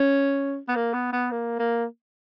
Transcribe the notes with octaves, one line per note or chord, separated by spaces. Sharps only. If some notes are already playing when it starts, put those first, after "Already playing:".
Already playing: C#4
B3
A#3
B3
B3
A#3
A#3